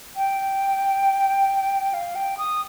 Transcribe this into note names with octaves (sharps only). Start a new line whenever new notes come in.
G5
F5
G5
D#6